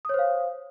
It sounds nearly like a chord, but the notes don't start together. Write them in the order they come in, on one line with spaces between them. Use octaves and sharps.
D#6 C#5 C5 F5